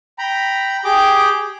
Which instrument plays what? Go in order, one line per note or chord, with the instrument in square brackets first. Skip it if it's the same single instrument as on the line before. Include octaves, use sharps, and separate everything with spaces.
[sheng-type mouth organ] G5 A#5 B5
G4 G#4 G5 D6